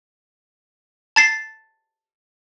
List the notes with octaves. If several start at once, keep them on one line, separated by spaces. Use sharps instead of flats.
A5 A6 C7